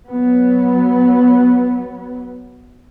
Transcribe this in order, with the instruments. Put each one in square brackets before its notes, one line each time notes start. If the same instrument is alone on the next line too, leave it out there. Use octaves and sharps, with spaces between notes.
[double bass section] F#3 B3